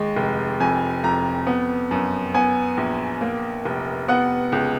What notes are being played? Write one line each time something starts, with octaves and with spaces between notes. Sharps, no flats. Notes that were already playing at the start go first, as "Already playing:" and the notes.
Already playing: D#2 G#3
F1
F2 G#5
F2 A#5
B3
F#2
B3 G#5
A#1
A#3
F1
B3 F#5
C#2